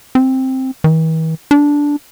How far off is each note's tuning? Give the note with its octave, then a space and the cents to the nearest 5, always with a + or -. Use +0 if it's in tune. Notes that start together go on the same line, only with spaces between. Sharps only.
C4 +5
E3 -45
D4 -10